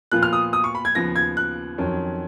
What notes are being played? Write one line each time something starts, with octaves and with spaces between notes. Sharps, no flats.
A#2 F3 B3 F4 F#6
F6
D#6
D#6
C#6
B5
G#6
D#2 C#3 F3 B3 A#6
G#6
F#6
F2 D#3 F#3 C#4